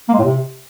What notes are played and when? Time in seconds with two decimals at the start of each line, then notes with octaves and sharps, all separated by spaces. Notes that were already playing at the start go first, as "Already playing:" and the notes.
0.09 A#3
0.14 G#3
0.19 A2
0.24 C3